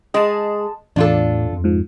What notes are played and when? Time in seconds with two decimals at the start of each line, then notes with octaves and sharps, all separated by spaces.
0.14 G#3 G#4 D#5 A5
0.96 E2 A2 D4 F4 A4
1.53 F2
1.64 G#2 F3